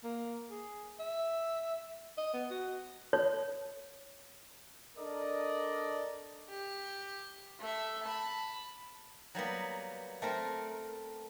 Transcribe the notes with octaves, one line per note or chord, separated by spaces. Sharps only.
A#3
G#4
E5
D#5
B3
F#4
C#5
D4 A4 A#4 D5 D#5
G4
A3 E5
A5 B5
F#3 G3 A#3 B3
A3 C4 A#4